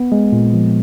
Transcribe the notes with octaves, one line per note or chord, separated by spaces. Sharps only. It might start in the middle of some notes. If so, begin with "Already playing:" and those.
Already playing: B3
G#3
A#2
F3